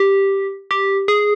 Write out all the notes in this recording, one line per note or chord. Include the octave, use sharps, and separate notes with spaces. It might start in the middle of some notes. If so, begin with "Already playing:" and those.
Already playing: G4
G4
G#4